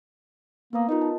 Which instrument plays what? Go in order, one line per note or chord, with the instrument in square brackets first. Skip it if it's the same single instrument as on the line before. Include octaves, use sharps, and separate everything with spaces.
[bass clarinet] A#3 [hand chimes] B3 B4 D#6
[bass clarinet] D#4 [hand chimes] F4 A#4 D#5
[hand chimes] A5